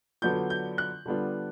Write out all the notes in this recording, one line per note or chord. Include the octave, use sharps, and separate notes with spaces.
D3 F#3 B3 D4 F4 G6
G6
F#6
D3 G3 B3 D4 F4